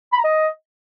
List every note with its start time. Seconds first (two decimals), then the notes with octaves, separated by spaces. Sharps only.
0.13 B5
0.18 A#5
0.24 D#5